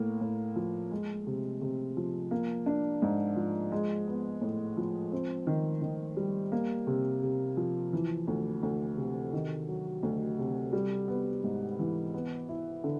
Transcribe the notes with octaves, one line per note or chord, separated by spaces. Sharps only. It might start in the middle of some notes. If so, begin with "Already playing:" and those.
Already playing: A2 A#3
A2
F3
G#3
C3
C3
F3
A#3
D4
G#2
F3
G#3
B3
A2
F3
C4
D#3
D#3
G3
A#3
C3
C3
F3
E3
D2
D2
C3
D#3
F#3
D2
C3
G3
B3
G#2
E3
B3
E4
D3